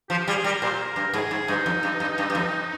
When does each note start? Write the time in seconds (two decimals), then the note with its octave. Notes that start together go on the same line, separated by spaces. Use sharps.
0.09 F3 G4
0.28 G3 G#4
0.44 G3 A#4
0.62 A#2 C5
0.80 A#4
0.96 G2
1.13 G#2 G#4
1.31 G#2
1.48 G2 D#4
1.66 F2
1.83 G2
2.00 G2
2.18 G2
2.30 G2
2.35 F2